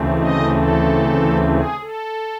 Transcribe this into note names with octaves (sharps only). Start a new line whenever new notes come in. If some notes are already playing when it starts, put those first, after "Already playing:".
Already playing: D2 C#3 E3 A3 C4
D#5
A4
G#4
A4